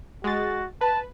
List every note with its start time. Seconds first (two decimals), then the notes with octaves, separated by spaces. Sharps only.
0.24 G#3 F#4 A6
0.81 B4 A5